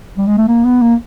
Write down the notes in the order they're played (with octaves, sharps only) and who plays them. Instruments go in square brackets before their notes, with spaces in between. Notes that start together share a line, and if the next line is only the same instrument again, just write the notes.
[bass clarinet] G3
G#3
A3
A#3
B3
A#3